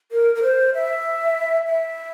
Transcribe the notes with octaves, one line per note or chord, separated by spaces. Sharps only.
A#4
A#4
C5
E5
E5